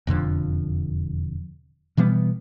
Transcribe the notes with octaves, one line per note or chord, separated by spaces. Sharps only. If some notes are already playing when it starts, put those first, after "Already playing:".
E1 F2 D3 F3
B2 E3 G3 B3